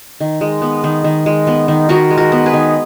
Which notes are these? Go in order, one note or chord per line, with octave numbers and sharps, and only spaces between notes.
D#3
G#3
B3
D#3
D#3
G#3
B3
D#3
D#3 F#4 A#4
G#3
F#4 A#4
B3
G#4 B4
D#3